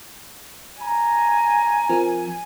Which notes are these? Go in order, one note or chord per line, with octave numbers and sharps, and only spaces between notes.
G#5 A#5
F3 C4 A#4